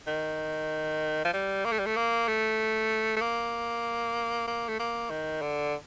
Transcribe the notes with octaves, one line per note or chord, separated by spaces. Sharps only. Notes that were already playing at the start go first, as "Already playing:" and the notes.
D#3
F3
G3
A#3
A3
G3
A3
A#3
A3
A3
A#3
A#3
A3
A#3
D#3
D3